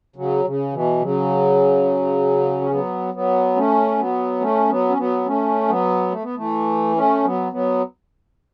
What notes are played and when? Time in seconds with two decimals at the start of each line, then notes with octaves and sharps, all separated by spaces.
0.16 C#3 F#3
0.45 C#3
0.73 B2 E3
1.01 C#3 F#3
2.61 C#4
2.71 F#3 B3
3.14 F#3 B3
3.56 A3 C#4
3.98 F#3 B3
4.40 A3 C#4
4.69 F#3 B3
4.89 C#4
4.97 F#3 B3
5.26 A3 C#4
5.68 F#3 B3
6.11 A3
6.23 B3
6.36 E3 A3
6.96 A3 C#4
7.24 F#3 B3
7.52 F#3 B3